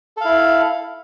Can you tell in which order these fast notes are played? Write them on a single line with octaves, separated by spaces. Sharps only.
A4 F5 E4